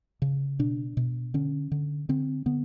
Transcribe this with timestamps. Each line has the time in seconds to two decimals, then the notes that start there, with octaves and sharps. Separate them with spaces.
0.22 C#3
0.59 B2 D4
0.97 B2
1.34 D3 C#4
1.71 D3
2.09 D3 C4
2.46 D3 B3